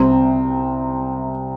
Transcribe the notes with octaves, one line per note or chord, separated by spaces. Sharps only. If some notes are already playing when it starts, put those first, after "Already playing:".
Already playing: C2 C3 G3 C4